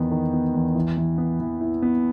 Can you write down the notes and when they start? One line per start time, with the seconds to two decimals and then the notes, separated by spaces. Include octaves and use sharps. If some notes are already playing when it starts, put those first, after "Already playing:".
Already playing: E2 D#3 B3
0.11 D#3
0.33 B3
0.54 E2
0.75 E3
0.97 E3
1.18 B3
1.40 E3
1.61 E4
1.82 B3